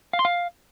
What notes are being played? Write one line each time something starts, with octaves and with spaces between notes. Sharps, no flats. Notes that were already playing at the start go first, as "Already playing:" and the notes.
F5
C6
F5